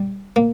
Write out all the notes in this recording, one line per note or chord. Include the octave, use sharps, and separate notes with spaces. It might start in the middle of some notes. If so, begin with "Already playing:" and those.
Already playing: G3
A#3